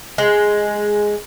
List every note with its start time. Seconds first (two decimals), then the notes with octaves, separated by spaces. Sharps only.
0.18 G#3